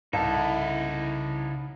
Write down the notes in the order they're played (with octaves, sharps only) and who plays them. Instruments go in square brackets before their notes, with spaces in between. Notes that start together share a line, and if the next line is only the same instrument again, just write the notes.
[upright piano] C2 A5 [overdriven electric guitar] C#3 E5 [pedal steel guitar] D#4 E4 A4